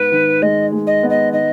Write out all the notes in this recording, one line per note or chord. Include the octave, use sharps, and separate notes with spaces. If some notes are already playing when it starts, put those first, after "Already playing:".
Already playing: G#2 B3 B4
D#3
G#3 D#5
G#3
D#5
B3
D#5
D#3 D#5